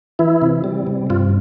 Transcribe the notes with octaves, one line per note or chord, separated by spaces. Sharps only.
E3 E4
C3
G3
C3
G2 F4